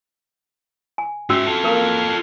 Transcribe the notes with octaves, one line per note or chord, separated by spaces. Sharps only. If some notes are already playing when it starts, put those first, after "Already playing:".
G#5
G#2 C#4 F#4 E5 E6
F4 A4
A#3 A#4